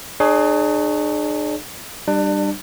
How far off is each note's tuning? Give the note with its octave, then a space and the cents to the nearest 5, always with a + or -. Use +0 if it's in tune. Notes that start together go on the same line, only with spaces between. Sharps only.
D4 +45 G#4 +15 C#5 +0
G3 +0 D4 +30